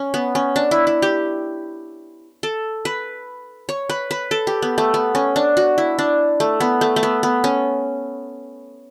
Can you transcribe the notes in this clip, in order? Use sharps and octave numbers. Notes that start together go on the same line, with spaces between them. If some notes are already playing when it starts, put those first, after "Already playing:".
Already playing: C#4
B3
C#4
D4
E4
E4
G4
A4
B4
C#5
B4
B4
A4
G4
B3
A3
B3
C#4
D4
F#4
E4
D4
A3
B3
A3
A3
B3
B3
C#4